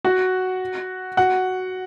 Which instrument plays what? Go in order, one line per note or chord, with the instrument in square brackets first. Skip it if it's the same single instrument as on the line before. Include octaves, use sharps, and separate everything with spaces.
[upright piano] F#4 F#5
F#4 F#5